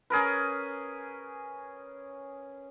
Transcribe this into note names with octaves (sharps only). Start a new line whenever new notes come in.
C#4 G#4 A#4 B4